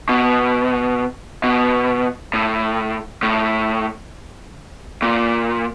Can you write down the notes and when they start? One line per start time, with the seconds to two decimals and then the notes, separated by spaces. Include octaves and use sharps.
0.09 B2
1.44 B2
2.34 A2
3.23 A2
5.02 A#2